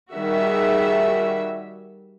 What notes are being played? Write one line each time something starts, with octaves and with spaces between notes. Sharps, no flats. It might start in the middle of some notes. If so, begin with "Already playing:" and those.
D#3 G3 F#4 G#4 E5